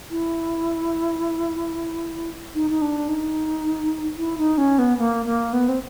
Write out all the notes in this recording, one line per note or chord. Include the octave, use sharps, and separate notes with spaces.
E4
D#4
D#4
D4
D#4
E4
D#4
C#4
B3
A#3
A#3
B3
C4